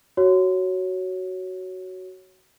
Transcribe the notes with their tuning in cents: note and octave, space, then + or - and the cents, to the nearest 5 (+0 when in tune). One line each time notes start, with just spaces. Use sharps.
F#4 +10 C#5 +0